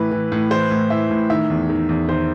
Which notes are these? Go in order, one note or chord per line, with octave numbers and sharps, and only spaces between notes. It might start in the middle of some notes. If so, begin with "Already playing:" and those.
Already playing: A2 E3 B4
E3
A2
E3 C5
A2
E3 E5
A2
D#3 E5
E2
D#3
E2
D#3 C5